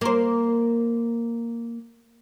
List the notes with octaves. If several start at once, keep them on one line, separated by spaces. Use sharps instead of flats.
A#3 C5